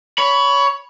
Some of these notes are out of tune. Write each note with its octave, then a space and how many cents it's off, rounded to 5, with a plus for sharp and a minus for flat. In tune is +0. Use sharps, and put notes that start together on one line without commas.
C#5 +20 B5 +0